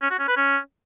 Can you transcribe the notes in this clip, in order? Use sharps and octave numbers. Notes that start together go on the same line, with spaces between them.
C#4
F#4
C#4
B4
C#4